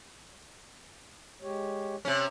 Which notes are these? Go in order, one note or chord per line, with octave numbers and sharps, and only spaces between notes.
G#3 G4 C#5
C3 C#4